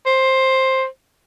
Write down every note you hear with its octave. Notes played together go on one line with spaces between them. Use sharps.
C5